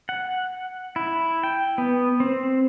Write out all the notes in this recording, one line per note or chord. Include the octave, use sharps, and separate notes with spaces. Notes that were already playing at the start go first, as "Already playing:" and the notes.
F#5
E4
G5
B3
C4